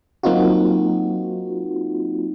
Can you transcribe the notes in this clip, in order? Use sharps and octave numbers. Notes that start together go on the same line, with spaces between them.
F#3 A#3 C4 D#4 F4 F#4